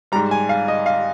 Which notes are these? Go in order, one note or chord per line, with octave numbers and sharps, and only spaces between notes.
G#2 G3 A#5
G#5
F5
D#5
F5